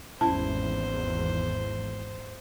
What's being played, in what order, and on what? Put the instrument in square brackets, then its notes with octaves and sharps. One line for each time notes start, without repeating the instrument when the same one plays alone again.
[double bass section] G#1 E2 [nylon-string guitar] G3 C#4 E4 [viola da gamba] C5 [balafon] A5